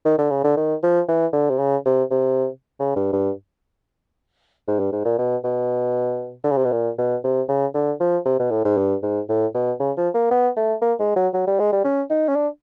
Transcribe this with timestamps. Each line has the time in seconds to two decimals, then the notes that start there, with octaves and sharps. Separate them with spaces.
0.05 D#3
0.18 D3
0.31 C#3
0.44 D3
0.57 D#3
0.83 F3
1.08 E3
1.33 D3
1.50 C3
1.59 C#3
1.86 C3
2.11 C3
2.79 C#3
2.96 G2
3.13 G2
4.68 G#2
4.79 G2
4.92 G#2
5.05 A#2
5.19 B2
5.44 B2
6.44 D3
6.51 C#3
6.57 C3
6.65 B2
6.72 A#2
6.98 B2
7.24 C3
7.49 C#3
7.74 D3
8.00 F3
8.25 C3
8.39 B2
8.51 A2
8.65 G#2
8.77 G2
9.02 G#2
9.29 A2
9.55 B2
9.80 C#3
9.97 F3
10.14 A#3
10.31 B3
10.57 A3
10.82 A#3
11.00 G#3
11.16 F#3
11.34 F#3
11.47 G3
11.59 G#3
11.73 G3
11.84 C#4
12.10 D#4
12.28 C#4
12.36 D4